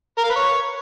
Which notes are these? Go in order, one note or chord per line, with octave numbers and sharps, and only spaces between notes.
A#4
F5
B4
C#5